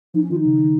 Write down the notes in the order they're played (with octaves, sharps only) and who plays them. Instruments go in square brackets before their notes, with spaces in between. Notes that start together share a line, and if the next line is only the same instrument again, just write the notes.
[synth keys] F3 [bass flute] D#4
[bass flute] C#4
[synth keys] D#3 [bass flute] F4
[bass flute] D#4
[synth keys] C#3
D#3